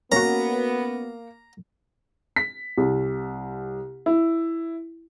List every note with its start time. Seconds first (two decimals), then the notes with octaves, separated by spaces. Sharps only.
0.12 A#3 B3 C#4 F#4 A#5
2.36 B6
2.78 C2
4.06 E4